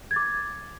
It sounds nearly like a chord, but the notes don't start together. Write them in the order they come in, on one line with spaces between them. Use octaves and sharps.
G#6 A6 D6